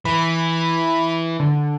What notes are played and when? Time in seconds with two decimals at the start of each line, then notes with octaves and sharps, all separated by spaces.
0.05 E3 B5
1.40 D3